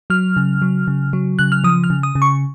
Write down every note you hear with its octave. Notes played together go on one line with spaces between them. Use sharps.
F#3 F6
C#3
F#3
C#3
F#3
C#3 F#6
F6
F3 D#6
F6
C#3
D#6
C#3
C#6